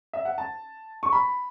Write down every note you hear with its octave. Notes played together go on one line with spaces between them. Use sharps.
E5
F#5
A5
C#6
B5